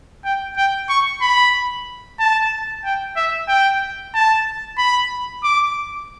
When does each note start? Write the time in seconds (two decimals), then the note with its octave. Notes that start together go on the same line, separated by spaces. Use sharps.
0.24 G5
0.57 G5
0.89 C#6
1.21 B5
2.19 A5
2.85 G5
3.16 E5
3.48 G5
4.14 A5
4.78 B5
5.43 D6